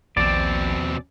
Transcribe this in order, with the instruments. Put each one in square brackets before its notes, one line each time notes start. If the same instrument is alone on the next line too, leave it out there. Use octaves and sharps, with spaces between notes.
[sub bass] A#1 [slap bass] D#2 F3 A#3 [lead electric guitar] B2 C4 [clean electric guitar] D5